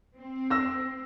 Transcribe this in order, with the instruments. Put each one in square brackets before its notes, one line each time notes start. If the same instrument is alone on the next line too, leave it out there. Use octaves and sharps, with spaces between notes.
[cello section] C4
[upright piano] E6 A#6